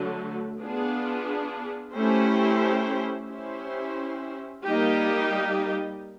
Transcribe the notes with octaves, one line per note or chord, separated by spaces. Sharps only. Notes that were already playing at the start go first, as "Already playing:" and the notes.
Already playing: D3 F#3 A3
B3 D4 F4 G#4
A3 C#4 E4 G4 C5
C#4 E4 G4 C5
G3 A#3 D#4 G4